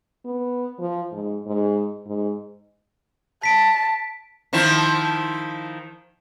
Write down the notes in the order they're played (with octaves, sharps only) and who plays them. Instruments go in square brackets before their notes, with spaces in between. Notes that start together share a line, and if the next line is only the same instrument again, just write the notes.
[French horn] B3
F3
G#2
G#2
G#2
[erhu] A5 [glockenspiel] B6 D7
[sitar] D#3 F3 E4